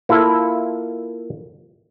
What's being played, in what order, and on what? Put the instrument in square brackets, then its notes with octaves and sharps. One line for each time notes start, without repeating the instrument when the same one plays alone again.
[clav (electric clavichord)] A#3 E4 F4 A4